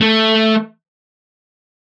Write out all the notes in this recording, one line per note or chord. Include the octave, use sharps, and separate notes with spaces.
A3